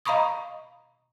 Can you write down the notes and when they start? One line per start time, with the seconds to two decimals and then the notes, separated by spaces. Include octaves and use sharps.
0.05 D#5 F5 A#5 B5 C#6 D#6